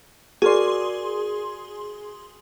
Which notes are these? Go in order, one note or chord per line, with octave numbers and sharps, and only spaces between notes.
F#4 G#4 A#4 D5 C6